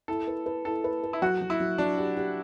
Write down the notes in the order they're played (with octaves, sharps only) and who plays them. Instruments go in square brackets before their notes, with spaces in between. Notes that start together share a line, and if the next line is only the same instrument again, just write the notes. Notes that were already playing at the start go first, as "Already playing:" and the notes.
[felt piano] E4 [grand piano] A4
[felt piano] B4
B4
[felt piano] E4 [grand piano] A4
[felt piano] B4
B4
[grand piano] E4
[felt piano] F#3 [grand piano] F#4
[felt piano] F#3
[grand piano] E4
[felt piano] F#3
[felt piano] F#3 [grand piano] D4
[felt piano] G4
G4